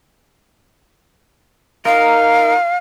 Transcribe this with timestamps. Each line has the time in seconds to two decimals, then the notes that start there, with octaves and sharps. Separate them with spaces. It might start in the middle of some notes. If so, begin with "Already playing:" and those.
1.85 D#4 A#4 F5